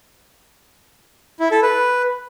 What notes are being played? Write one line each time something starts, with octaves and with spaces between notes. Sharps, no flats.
E4
A4
B4